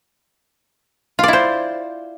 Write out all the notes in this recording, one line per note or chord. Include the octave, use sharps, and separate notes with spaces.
E4 F4 C5 D5